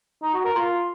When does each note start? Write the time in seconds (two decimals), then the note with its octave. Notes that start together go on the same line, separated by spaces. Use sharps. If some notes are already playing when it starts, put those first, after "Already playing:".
0.23 D#4
0.34 F#4
0.45 A#4
0.56 F4